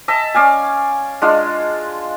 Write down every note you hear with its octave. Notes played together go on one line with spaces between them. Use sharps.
D#5 E5 A5
C#4 D5 F5 G#5
G#3 D4 F4